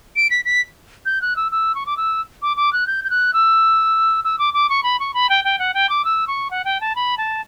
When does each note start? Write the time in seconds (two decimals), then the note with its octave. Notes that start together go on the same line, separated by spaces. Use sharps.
0.16 D7
0.30 B6
0.45 B6
1.06 G6
1.22 F#6
1.36 E6
1.52 E6
1.75 C#6
1.86 D6
1.97 E6
2.42 D6
2.57 D6
2.73 F#6
2.87 G6
3.04 G6
3.10 F#6
3.33 E6
4.24 E6
4.39 D6
4.54 D6
4.69 C#6
4.83 B5
5.00 C#6
5.14 B5
5.30 G5
5.44 G5
5.59 F#5
5.74 G5
5.89 D6
6.05 E6
6.28 C#6
6.51 F#5
6.65 G5
6.81 A5
6.96 B5
7.18 A5